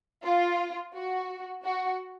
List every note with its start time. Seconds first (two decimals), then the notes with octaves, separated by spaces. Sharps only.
0.25 F4
0.95 F#4
1.64 F#4